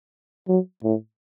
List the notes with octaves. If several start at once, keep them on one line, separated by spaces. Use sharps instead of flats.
F#3
A2